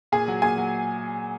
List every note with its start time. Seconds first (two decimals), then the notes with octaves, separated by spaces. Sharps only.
0.12 A#2 G#4 G#5
0.28 F#3
0.42 A#2 G#4 G#5
0.58 F#3